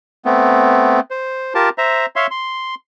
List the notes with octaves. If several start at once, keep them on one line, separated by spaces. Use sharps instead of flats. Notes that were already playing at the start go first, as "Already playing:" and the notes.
A3 B3 C4
C5
F4 G4 A#4 A5
C5 E5 A#5
C#5 E5 F5 C6
C6